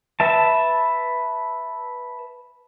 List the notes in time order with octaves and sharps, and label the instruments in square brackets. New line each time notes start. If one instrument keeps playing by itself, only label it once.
[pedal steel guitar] B4 E5 A5